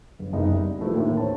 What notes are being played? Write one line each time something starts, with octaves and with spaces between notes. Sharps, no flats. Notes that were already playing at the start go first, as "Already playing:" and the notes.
G1
F#1 C2 B3 D#4 E4 D#5
G3
F3 A3 E4 B4
D#2 A2 D3 D#3
C5 C#5 A5